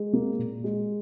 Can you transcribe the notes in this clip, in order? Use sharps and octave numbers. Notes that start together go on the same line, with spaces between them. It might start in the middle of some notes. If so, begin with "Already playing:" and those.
Already playing: G#3
A#3
A#2
G#3